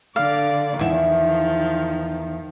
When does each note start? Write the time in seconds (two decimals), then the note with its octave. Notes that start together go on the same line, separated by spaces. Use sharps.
0.16 D3 D5 F5
0.79 E2 D#3 F3 E4